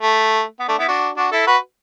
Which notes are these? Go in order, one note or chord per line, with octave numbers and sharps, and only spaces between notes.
A3
B3
A3 D4
B3 E4
D4 F#4
D4 F#4
E4 A4
F#4 B4